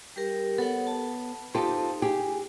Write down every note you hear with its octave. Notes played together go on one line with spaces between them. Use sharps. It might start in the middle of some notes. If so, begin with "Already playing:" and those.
G3 G4 A#4
B3 A4 C#5 F#5
A5
D#4 F4 G4 A4 C5
G4 G#4